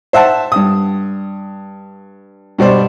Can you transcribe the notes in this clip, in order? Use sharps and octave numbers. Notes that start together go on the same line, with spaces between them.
C5 E5 F#5 A5
G2 D#6
G2 B2 G3 C5 D5